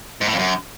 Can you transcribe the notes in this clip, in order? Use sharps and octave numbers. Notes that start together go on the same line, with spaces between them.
G#2
A2
F2
F#2